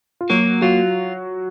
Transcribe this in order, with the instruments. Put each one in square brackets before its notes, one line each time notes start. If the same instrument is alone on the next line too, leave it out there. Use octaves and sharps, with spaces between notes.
[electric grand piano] F4
[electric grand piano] F#3 F#4 [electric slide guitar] A#3
[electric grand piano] F#3 F#4 [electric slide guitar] F4